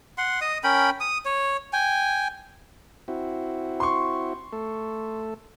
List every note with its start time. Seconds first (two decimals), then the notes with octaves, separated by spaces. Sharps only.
0.18 F#5 C6
0.41 D#5 D#6
0.64 C#4 A#4 G5 B5
1.00 D#6
1.25 C#5
1.73 G5 G#5
3.08 C4 E4 F#4
3.80 C6 C#6
4.53 A3 A4